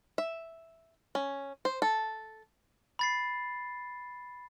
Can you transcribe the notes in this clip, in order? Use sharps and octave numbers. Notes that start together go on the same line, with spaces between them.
E5
C#4
C5
A4
B5 A6 C7